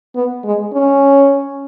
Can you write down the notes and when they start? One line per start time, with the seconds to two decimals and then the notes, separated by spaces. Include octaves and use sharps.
0.15 B3
0.44 G#3
0.74 C#4